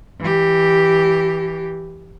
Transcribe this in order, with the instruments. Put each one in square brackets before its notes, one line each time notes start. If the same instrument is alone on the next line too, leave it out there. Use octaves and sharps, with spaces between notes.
[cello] E3 G4